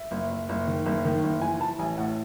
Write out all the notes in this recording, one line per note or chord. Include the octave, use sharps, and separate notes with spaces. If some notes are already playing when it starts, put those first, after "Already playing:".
Already playing: E5
F#1
F#1
F#1
D#3
F#1
D#3
F#1
E3 G#5
E3 A5
A1 G#5
A2 F#5